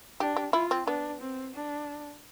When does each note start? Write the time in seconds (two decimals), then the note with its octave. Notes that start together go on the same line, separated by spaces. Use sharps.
0.20 D4 G4
0.36 G4
0.53 E4 F4
0.71 C4
0.87 B3 D4
1.21 C4
1.55 D4